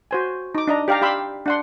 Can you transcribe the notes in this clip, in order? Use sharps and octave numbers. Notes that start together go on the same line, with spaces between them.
F#4 C5 G#5
D#4 D6
D4 D#5 A#5
G4 D5 F5 G5 A#5
G4 F5 B5 C6 E6
D4 F#5 C6